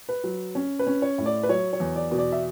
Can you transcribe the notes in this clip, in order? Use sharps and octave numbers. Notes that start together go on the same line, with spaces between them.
B4
F#3
C#4
B4
C#4
C#5
A2
D5
B4
F#3 C#5
C#5
E2
D5
B2
D5
E5